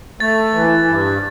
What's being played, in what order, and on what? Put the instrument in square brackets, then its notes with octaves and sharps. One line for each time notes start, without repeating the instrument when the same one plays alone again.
[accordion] A3 [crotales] A6
[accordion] E3
G2